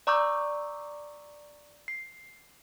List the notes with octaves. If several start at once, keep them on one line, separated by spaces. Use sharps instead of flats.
D5 A#5 C#6 D6 E6 G6
C7